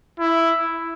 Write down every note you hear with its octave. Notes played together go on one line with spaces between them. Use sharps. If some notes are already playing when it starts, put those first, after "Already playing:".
E4